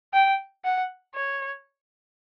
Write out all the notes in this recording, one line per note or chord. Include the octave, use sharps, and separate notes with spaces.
G5
F#5
C#5